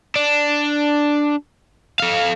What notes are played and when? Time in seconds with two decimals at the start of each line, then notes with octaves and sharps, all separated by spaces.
0.16 D4
2.00 A4 F5